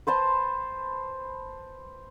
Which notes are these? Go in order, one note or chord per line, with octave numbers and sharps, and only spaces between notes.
B4 C5 A5 C6